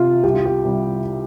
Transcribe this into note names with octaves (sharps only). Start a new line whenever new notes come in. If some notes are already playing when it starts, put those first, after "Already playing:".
Already playing: C3 F4
C2 G4
F4
G4
C3 G3